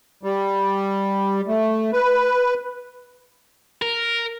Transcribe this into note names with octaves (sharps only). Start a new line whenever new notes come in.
G3
A3
B4
A#4